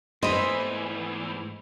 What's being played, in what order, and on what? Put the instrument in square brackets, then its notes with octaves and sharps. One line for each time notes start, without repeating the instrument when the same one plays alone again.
[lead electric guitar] E2 E3 [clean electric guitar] G#2 A3 C4 [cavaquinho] C5 B5 [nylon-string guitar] D#5